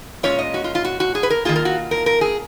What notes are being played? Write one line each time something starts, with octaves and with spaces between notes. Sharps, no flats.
A#2 G#3 C#4 F4 C#5
D#5
F#4
F4
F4
F#4
F#4
G#4
B4
A#4
D#3 A#3 F4 G#4
A#4
F#4
A#4
A#4
G#4